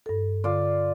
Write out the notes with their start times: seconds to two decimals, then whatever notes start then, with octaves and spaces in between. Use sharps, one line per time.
0.06 G2 A4
0.44 D3 F4 D5